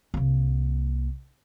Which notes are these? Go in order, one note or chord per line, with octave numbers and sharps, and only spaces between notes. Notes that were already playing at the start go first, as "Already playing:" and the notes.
C2 A#3